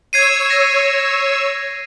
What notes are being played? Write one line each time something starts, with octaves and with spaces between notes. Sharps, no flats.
C#5 E6 G#6 C7 D#7
A#6